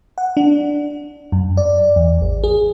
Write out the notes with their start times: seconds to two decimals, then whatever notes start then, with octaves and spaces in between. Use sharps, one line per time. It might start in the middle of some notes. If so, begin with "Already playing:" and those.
0.18 F#5
0.37 D4
1.32 F#2
1.57 D5
1.96 E2
2.21 G#1
2.44 G#4